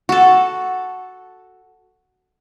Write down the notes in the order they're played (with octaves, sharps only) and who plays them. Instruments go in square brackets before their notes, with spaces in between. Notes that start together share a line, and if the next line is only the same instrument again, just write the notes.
[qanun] F#4 A4